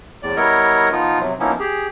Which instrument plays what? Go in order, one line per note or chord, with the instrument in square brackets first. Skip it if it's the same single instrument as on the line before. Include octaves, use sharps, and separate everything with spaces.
[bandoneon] E2 A2 D5
G3 B3 E4 A#4 C#5 D#5
F3 B3 D#4 F4
C3 F#3
F3 A#3 B3 C#4 D#4 E4
G4 G#4